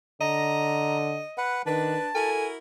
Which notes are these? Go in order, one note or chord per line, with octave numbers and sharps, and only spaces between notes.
D3 D#5 A#5
B4 F#5
D#3 D4 B4 A5
E4 F#4 A4 A#4 G#5